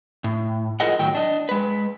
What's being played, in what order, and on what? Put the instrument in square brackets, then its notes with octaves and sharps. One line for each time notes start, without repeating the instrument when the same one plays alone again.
[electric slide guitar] A2
E4 F4 G#4 A#4 D#5 F#5
A2 D#3 F#3 G5
D4 D#5
G#3 B4